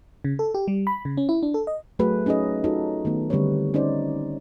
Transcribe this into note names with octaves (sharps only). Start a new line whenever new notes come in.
C#3
A4
G4
G3
B5
C#3
C#4
E4
D4
A4
D#5
F#3 A3 F#4 G#4 B4
C#4 D#4 G#4 B4 D#5
D#4 F4 F#4 A4 C#5
D#3 A3 B3
D3 G3 C4 B4 C#5
C#4 D#4 C5 D5